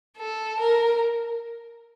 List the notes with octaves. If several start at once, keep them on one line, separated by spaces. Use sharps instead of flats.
A4
A#4